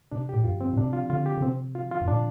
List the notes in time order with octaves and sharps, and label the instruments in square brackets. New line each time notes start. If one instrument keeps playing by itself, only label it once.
[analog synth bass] C3 [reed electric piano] D4
[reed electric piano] G4
[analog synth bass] A#2
[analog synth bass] G2 [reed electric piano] F4
[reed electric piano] C4
[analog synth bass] A#2
[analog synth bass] C3 [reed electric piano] D4
[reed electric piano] F4
[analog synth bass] D3 [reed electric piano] F4
[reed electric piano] G4
[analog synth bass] D3
[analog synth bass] C3 [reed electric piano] C4
[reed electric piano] F4
F4
[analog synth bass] G2
[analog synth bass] A#2 [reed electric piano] D4